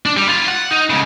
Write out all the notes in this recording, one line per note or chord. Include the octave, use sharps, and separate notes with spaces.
D4
G3
E4 F4
F#5
D#4
G#2 C#3